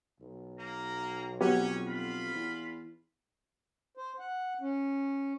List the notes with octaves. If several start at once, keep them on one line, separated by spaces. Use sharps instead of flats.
B1
A#3 A#5
F2 F#3 B3 C#4 G4
F4 F5 B5
E2
C5
F#5
C#4